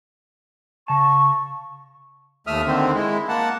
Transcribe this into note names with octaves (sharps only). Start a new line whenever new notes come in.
C#3 A5 C#6
D#2 A3 E5 D#6 F6
D3 D#3 C4
G#3 E4
A#3 F#5 A5